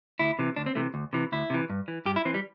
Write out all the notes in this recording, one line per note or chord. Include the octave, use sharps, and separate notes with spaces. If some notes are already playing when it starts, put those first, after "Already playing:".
D2 E4
C3 E3
D2 D4
C4
C3 E3 A3
D2
C3 E3
D2 E4
C3 E3
G2
E3
G2 G4
E4
E3 C4
G3